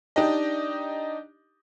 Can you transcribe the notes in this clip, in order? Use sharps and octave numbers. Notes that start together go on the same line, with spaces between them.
D4 D#4 G4 D#5